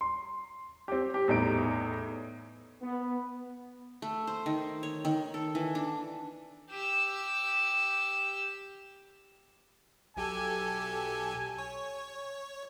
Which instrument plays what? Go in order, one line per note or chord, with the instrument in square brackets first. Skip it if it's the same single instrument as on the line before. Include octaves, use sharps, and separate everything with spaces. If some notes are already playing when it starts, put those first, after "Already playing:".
[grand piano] C6
C4 G4
G4
E2 A2 D#4 D7
[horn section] B3
[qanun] A3
C5
D#3
C#5
D#3
A4
E3
D4
[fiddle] G4 E6
[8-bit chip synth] B1 G4 A4 [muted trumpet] G#5
[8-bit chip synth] C#5